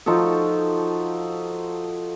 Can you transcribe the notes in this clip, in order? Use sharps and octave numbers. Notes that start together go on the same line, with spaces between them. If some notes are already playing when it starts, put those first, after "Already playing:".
F3 D#4 F#4 A4